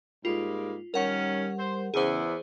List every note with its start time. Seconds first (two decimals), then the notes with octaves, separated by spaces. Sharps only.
0.25 G#2 G3 G#3 A#3 F4
0.94 D#3 G3 C#4 A#4 F#5
1.58 C5
1.94 E2 C#3 G#4 C5